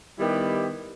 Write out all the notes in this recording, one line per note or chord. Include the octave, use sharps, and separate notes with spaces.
D#3 G3 B3 E4 G4